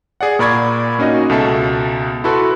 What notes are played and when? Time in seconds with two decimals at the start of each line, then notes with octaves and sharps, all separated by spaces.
0.21 G#4 D5 F#5
0.39 A#2 A#4 D5 B5 C#6 G#6
0.99 A#3 C#4 D#4 F#4 D#5
1.29 C#2 B2 A4 E5 A5 C7
2.24 E4 F#4 A4 B4 C6